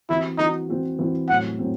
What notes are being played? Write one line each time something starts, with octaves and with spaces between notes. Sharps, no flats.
E3 C4 E4 F#4
E3 C4 D#4 F#4
E3 C4 F#4
E3 C4 F#4
A2 F#3 C4 F#5
A2 F#3 C4